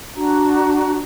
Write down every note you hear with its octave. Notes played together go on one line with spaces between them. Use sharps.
D4 F#4 A#5